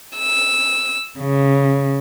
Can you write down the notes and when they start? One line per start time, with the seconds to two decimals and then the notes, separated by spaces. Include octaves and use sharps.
0.17 E6
1.19 C#3